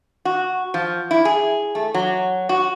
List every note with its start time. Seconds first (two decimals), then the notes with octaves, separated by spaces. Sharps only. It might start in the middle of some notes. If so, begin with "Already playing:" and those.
0.25 F#4
0.74 F3
1.11 E4
1.25 G#4
1.75 A3
1.95 F#3
2.49 F#4